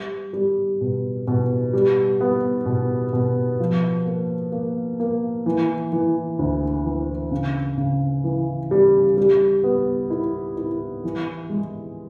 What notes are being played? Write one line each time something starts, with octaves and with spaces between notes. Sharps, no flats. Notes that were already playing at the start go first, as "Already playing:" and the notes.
Already playing: G3
G3
B2
B2
G3
B3
B2
B2
F3
A#3
A#3
A#3
E3
E3
D2
E3
C#3
C#3
E3
G3
G3
B3
E4
E4
E3
G#3